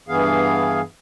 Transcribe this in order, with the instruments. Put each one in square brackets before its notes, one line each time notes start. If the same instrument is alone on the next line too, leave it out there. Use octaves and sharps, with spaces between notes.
[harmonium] G2 E3 B3 G#4 F5